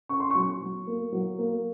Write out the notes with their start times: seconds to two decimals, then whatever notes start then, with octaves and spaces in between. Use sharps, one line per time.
0.09 C#4 C#6
0.20 C6
0.30 F#3 C#6
0.61 F#3
0.87 A#3
1.12 F#3
1.38 A#3